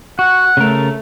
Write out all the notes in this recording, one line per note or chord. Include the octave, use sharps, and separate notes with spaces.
F#4 F#5
C#3 A3 A#4